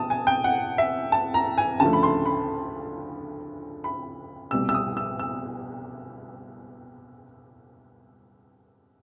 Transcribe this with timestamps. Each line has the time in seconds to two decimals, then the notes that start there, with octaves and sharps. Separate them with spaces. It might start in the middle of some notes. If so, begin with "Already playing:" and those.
Already playing: B2 A5 D#6
0.10 G#5
0.27 G5
0.44 F#5
0.78 E5
1.12 A5
1.34 A#5
1.58 G#5
1.80 D2 C#3 F3 A3 A5
1.93 B5
2.03 C6
2.26 B5
3.84 B5
4.51 C2 B2 G3 E6
4.69 E6
4.74 D#6
4.97 E6
5.19 E6